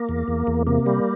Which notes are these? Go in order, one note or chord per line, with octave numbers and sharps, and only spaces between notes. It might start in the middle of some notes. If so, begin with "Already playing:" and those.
Already playing: A#3
E2
E2
E2
C3 A#3
G3